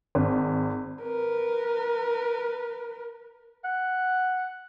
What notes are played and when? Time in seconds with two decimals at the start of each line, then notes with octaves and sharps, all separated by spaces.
0.15 G#1
1.02 A#4 B4
3.64 F#5